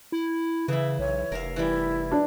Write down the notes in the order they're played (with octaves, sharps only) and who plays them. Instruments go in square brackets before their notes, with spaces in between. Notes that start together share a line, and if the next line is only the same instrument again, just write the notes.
[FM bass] E4
[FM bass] C#3 [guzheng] E3 E4 [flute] E5
[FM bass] B1 [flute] C#5
[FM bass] F1 [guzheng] A#4 E5 F5
[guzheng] E3 G3 [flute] E4
[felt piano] D4